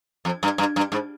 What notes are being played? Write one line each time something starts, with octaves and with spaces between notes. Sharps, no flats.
F2
G2
G2
G2
G#2